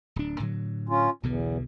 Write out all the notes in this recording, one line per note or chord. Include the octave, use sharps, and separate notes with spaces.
D1 D4
A2 D3 F#3
C#4 F4
B1 E2 B2 D3